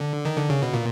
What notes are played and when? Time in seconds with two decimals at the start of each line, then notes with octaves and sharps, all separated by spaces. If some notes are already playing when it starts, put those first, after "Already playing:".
Already playing: D3
0.25 D#3
0.37 D3
0.50 C#3
0.62 B2
0.73 A#2